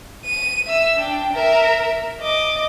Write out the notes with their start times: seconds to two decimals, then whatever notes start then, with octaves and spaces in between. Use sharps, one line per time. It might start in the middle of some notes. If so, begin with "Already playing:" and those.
0.25 D#7
0.67 E5 E6
0.98 D4 G5
1.33 A#4 E5
2.21 D#5 D6